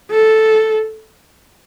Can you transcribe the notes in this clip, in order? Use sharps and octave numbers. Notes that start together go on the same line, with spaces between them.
A4